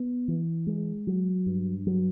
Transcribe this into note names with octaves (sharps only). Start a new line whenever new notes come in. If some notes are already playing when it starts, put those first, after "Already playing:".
Already playing: B3
E3
G#3
F#3
G2
F#3